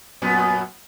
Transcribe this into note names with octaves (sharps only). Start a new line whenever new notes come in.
F#2 A#2 B3